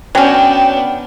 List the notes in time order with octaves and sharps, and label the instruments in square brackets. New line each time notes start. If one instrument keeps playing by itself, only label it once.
[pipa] F#3 C#4 [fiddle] B3 D4 [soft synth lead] G5